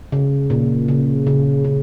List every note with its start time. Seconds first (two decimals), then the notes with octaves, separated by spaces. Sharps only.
0.12 C#3
0.50 A#2
0.88 C#3
1.27 C#3
1.64 C#3